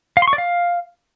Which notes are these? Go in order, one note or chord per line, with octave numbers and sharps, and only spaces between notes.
F5
C6
C#6
D5
F5